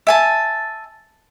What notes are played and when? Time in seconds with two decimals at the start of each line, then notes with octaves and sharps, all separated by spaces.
0.07 E5 G#5 A5